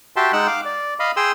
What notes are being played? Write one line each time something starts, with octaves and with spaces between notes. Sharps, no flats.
F#4 G4 E5 G5 A5 C6
G#3 D#4 F#5 G5 E6 F#6
F5 D6
D5
D#5 F5 B5
G#4 G5 C6 D#6 E6